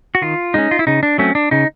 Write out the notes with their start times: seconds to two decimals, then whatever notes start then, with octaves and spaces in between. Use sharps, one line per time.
0.15 F#4
0.22 D#3 F4
0.54 G#3 C#4 D#4
0.71 F4
0.79 E4
0.87 C#3 D#4
1.03 D4
1.18 F#3 A3 C4 C#4
1.35 D4
1.51 C#3 D#4